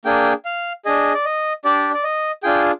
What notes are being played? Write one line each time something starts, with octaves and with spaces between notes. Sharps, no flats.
A#3 D4 G#4 G5
F5
D4 G#4 D#5
D5
D#5
D4 G4 D5
D5
D#5
D4 F4 G#4 G5